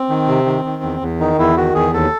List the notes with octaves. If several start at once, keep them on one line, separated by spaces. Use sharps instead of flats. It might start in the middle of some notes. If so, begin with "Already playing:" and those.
Already playing: C4
D#3
C3
D#3
D#3
E2
E2
D#3 D#4
E2 E4
D#3 F#4
E2 G#4
D#2 A4